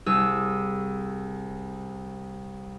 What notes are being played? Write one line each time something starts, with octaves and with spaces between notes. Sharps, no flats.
C2 G#4 E6